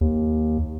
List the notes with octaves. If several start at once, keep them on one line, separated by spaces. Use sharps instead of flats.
D#2